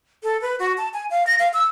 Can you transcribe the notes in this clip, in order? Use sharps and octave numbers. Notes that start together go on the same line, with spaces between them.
A4
B4
F#4
A5
G#5
F5
A#6
F5
E6